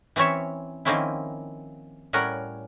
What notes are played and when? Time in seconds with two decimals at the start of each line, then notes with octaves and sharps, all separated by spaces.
0.16 E3 C4 C#4 C#5 E5
0.85 D#3 F3 A#3 C4 C#4 E4
2.13 A2 G3 C#4 A#4 F#5